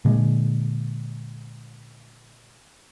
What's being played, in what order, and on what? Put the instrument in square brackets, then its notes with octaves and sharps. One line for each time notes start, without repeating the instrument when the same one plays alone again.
[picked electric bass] A#2 D3 G#3